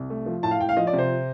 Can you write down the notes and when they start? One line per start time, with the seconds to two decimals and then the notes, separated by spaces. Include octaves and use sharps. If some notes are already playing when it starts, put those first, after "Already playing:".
Already playing: C2
0.10 A3
0.26 F3
0.43 A2 A5
0.51 F5
0.59 A2 G5
0.69 F5
0.77 F3 D#5
0.87 D5
0.93 C3
0.98 C5